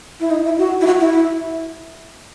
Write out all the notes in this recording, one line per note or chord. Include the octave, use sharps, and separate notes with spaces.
E4
D#4
E4
F#4
E4
F#4
E4